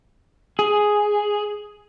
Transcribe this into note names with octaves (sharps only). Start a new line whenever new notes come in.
G#4